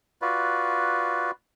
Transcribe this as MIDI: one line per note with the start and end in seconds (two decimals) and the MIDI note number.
0.22 1.31 65
0.22 1.31 66
0.22 1.31 71
0.22 1.31 74